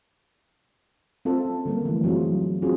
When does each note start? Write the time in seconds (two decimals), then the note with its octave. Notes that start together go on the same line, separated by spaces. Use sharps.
1.25 C4 F4 A4
1.45 C#4
1.65 D3 G3 A#3 A#4
1.85 E3 F3 A3
2.04 F#3 C4 E4 F4 G#4
2.62 C4 C#4 F4 F#4 G#4